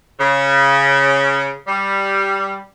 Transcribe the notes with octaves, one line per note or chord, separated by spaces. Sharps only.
C#3
G3